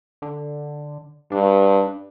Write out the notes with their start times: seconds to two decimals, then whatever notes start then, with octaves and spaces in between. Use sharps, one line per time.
0.22 D3
1.32 G2 D4